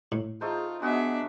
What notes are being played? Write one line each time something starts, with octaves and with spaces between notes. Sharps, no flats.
A2
A3 D#4 F4 G#4 C5
G#3 B3 D4 F#4 G#4 E5